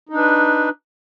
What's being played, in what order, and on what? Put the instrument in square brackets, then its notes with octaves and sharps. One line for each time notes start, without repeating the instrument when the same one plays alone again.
[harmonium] D#4
D4
B4